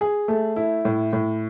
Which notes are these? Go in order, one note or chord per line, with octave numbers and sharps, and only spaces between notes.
G#4
A3
E4
A2
A2